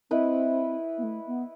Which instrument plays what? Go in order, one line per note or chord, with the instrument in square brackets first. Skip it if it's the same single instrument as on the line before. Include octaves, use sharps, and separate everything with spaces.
[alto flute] C4 [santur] E4 B4 D#5
[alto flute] B3
A3
B3